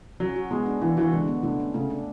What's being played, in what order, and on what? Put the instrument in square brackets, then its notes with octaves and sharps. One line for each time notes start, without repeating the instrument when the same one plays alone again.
[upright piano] F#3 [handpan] C#4
[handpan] F#4
[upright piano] G#3 [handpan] B3
[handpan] D4
[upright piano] E3 [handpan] D4
[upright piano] E3 [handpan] F#4
[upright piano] D3 [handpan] G#3
[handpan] B3
[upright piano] D3 [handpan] A3
[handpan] C#4
[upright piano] C#3 [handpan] A3
[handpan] D4